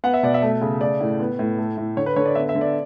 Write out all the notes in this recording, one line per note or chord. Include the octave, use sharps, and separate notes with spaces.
B3 F#5
E5
B2 D5
E5
A3
C#3
A3 D5
A2
B3
A2
A3
A2
D3 C#5
B4
D3 C#5
D5
B3 E5
E5
D3
D5